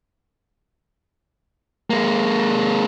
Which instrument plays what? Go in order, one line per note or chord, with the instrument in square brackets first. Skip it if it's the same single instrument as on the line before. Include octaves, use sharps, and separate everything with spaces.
[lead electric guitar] G#3 A#3